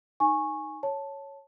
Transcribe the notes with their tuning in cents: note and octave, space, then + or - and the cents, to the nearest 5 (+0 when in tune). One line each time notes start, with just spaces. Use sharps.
D#4 +0 G#5 +0 C#6 -15
C#5 +0 A5 +0